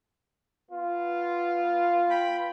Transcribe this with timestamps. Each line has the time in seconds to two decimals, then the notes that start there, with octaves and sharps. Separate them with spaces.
0.70 B3 F4
2.10 G5 B5